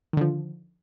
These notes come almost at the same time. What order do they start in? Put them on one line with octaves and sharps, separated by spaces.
D#3 D3 F3